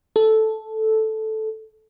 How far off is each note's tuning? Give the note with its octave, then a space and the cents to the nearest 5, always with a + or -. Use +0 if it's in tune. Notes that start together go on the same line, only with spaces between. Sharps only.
A4 -5